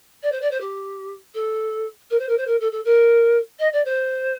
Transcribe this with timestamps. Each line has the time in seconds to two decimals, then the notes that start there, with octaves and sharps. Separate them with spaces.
0.22 D5
0.32 C5
0.41 D5
0.51 C5
0.60 G4
1.34 A4
2.10 A#4
2.19 C5
2.28 A#4
2.37 C5
2.47 A#4
2.60 A4
2.72 A4
2.85 A#4
3.59 D#5
3.72 D5
3.85 C5